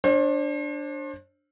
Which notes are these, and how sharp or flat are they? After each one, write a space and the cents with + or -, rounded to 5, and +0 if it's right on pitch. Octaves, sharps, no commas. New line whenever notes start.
D4 +0 C5 +40